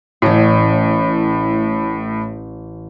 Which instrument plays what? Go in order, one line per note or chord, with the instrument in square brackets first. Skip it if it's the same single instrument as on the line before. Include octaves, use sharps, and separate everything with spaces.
[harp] A1 C#4 [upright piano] A2